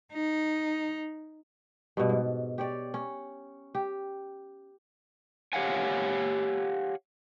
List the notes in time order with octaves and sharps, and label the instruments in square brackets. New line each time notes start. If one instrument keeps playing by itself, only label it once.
[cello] D#4
[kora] G2 B2
G#2
G4 C#5 D5
C#4
G4
[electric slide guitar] G4 C#5 F5 F#5 G#5